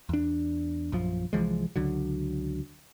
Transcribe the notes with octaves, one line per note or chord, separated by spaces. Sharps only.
E2 D4
A#1 F#2 F3
C2 E3 F3 G#3
C#2 D3 F#3